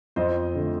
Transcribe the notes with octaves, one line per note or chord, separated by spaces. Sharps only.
F2 C5 D#5
D3 A3